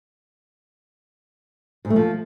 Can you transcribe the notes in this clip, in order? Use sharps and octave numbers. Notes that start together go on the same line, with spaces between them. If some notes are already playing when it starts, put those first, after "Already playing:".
G#2
A3
F3